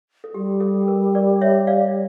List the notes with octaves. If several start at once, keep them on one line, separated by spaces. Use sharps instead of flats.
A4
G3 G4
A4
A#4
A#4 D5
C#5 E5
D5 F5